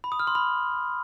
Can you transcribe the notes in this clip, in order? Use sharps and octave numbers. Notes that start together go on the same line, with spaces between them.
B5
D#6
F6
C6
B5